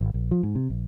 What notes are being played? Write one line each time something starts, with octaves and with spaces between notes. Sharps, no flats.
G#1
A#1
F3
G#2
C3
A#1